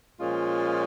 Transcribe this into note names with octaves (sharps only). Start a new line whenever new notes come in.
A#2 F3 G#3 C#4 F4